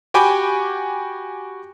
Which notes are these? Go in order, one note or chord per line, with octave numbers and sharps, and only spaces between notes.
F#4 G4 G5 G#5 B5 D6